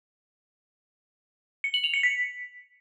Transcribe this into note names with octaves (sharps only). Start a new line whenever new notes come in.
C#7
F#7
F7
C#7
B6